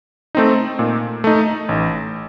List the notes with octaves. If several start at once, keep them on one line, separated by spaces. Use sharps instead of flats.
A3 C4 D#4
A#2
A3 D#4
A1